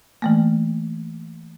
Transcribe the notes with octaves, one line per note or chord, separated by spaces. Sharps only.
E3 A3 A#3